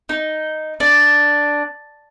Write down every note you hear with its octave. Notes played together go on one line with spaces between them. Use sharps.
D#4
D4